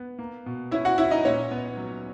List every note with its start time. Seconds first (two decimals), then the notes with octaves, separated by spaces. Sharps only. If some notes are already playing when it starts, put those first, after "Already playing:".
Already playing: B3
0.19 A#3
0.46 B2
0.71 C#4 E4 E5
0.85 F#4 F#5
0.98 C#4 E4 E5
1.11 D#4 D#5
1.25 A#2 C#4 C#5
1.51 B3
1.77 F#3